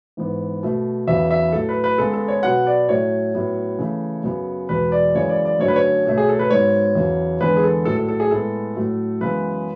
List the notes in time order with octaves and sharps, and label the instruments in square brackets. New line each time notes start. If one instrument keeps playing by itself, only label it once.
[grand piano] G#2 E3 B3
B2 A3
E2 C#3 F#3 B3 E5
E5
A2 F#3 A3 A4
B4
B4
C#3 G#3 B3 A4
A4
C#5
B2 F#3 B3 F#5
D5
A2 F#3 A3 C#5
A2 F#3 B3
C#3 E3 A3
F#2 C#3 F#3 B3
E2 B2 G#3 B3 B4
D5
F#2 C#3 E3 G#3 C#5
D5
D5
F#2 D3 F#3 A3 C#5
B4
C#5
B2 A3
G#4
A4
B4
G#2 F#3 B3 C#5
E2 C#3 F#3
E2 D3 G#3 B3 B4
G#4
A4
A2 F#3 A3 A4
A4
A4
G#4
A2 G#3 B3 A4
A2 F#3 A3
F#2 C#3 E3 G#3 B3 B4